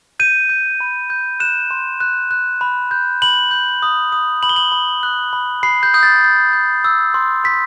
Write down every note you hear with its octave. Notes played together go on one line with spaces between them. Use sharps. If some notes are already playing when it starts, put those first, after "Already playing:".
G6 D#7
G6
B5
G6
F#6 E7
C6
F#6
F#6
B5
G6
B5 F#7
G6
D#6
D#6
B5 F#7
G7
F#7
B5
F#6
B5
B5 C7
G6
D#6 G6
A6
G6
G6
E6
C6
C6 B6